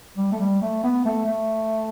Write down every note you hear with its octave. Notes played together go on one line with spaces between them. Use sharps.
G3
A3
G3
A3
B3
A3
A3